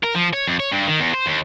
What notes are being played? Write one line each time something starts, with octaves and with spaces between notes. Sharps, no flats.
A#4
F3
C#5
F2
C#5
G2
D#3
E2
C5
D#2